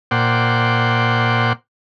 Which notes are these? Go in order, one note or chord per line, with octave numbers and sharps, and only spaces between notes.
A#2 C5 D5 F#5 G5